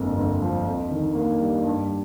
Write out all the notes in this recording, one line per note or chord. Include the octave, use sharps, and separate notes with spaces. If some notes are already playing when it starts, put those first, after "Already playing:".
Already playing: G1 F2 A#3
G1
F3
F2
D#3
A#3
G3
G2